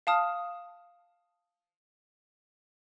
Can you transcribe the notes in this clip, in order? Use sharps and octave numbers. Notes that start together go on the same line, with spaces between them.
F5 A5 D#6 F6